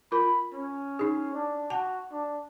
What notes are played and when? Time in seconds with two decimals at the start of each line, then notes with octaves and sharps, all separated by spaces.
0.12 F4 A#4 B5
0.53 C#4
0.99 D#4 G#4
1.34 D4
1.70 F#4 A5
2.12 D4